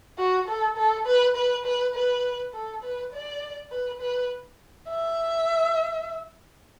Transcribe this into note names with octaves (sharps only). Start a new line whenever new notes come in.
F#4
A4
A4
B4
B4
B4
B4
A4
B4
D5
B4
B4
E5